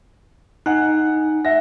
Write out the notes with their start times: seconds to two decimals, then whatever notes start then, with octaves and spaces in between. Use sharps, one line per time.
0.66 D#4 F#5 G#5 F#6
1.45 E5 F#5 A#6